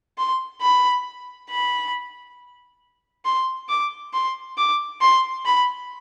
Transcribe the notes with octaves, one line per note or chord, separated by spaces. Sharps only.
C6
B5
B5
C6
D6
C6
D6
C6
B5